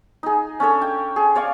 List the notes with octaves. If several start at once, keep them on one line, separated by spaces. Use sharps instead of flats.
D#4 G#4
C#4 D4 A4 C#5
G5
G#4
C#5 D5 F5 C#6